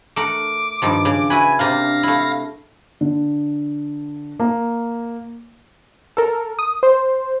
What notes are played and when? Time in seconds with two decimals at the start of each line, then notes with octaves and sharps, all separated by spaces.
0.16 A3 A#4 F#5 D6
0.82 G2 D#3 F3
1.05 C#3
1.30 E4 F#4 B4 G#5
1.59 C3 A#3 D4 F5 A#6
2.03 A3 E4
3.01 D3
4.40 A#3
6.17 A4 A#4
6.59 D#6
6.83 C5